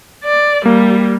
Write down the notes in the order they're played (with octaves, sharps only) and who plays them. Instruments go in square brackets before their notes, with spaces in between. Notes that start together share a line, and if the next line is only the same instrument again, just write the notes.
[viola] D5
[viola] G3 [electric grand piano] A#3